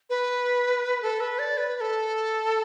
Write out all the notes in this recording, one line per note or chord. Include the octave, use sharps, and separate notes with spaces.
B4
A4
B4
D5
B4
B4
A4